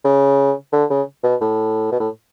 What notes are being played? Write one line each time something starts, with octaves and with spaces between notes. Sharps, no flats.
C#3
D3
C#3
B2
A2
B2
A2